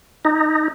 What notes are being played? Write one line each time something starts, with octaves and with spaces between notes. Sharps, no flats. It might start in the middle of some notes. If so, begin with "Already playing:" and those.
D#4